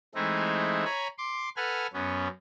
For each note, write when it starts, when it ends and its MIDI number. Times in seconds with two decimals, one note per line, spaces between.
0.15 0.84 52
0.15 0.84 56
0.15 0.84 57
0.15 0.84 60
0.15 0.84 63
0.15 0.84 64
0.85 1.08 73
0.85 1.08 80
0.85 1.08 82
0.85 1.08 83
1.18 1.49 84
1.18 1.49 86
1.56 1.87 69
1.56 1.87 71
1.56 1.87 78
1.56 1.87 80
1.56 1.87 89
1.93 2.28 42
1.93 2.28 59
1.93 2.28 61